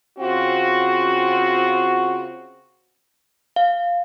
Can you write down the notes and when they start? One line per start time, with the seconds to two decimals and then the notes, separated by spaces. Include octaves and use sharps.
0.19 C#3 C4 F4 F#4
3.56 F5